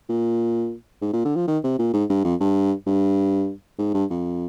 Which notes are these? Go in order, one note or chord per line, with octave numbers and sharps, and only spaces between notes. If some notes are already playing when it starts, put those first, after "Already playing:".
A#2
G#2
A#2
D3
F3
D#3
C3
A#2
G#2
G2
F2
G2
G2
G#2
G2
F2